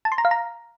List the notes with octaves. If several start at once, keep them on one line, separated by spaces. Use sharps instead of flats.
A5
C6
A#5
F5
A#5